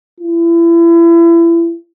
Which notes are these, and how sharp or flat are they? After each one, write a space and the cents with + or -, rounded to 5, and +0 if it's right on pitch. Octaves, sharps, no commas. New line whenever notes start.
E4 +30